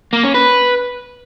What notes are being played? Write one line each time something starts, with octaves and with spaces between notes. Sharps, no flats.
A#3
C#4
B4